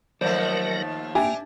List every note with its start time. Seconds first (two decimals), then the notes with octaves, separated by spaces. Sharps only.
0.21 D#2 F3 F#3 A3 A#4 C5 D5
1.15 A#3 D4 G4 E5 G#5